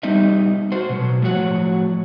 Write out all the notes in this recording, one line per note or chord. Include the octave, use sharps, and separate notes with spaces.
G3 B3 D#4 D#5 E5
F#4 C5
B2 F#3
A2 F3 F#4 C#5 F#5